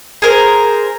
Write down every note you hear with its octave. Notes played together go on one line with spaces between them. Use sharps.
G#4 A#4 C5